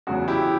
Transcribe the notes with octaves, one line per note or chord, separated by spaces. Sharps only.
E2 C#3 F#3 F#4
E4 G4